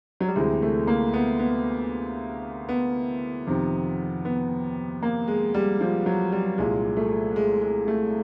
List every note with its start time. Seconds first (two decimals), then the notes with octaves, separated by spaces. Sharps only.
0.21 F#3
0.28 G3
0.35 D2 C3 E3 G#3
0.62 A3
0.87 A#3
1.13 B3
1.39 B3
2.69 B3
3.47 F2 C3 D#3
4.25 B3
5.03 A#3
5.28 G#3
5.54 G3
5.81 F3
6.06 F#3
6.32 G3
6.58 C2 A#2 G#3
6.97 A3
7.36 G#3
7.62 G#3
7.88 A3